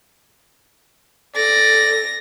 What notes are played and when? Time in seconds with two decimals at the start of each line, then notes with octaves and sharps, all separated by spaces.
1.36 A4 D5 A#6